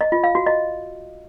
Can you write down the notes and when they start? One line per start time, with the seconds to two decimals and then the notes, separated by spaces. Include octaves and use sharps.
0.01 D#5
0.12 F4
0.24 F5
0.35 F#4
0.46 D#5